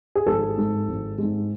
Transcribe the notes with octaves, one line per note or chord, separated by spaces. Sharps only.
G#4
G#1 A4
G#2 G#3
G#1
G#2 G#3